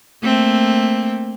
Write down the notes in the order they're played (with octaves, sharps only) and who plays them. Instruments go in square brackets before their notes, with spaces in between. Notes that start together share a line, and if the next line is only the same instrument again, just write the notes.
[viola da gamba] A3 A#3 C4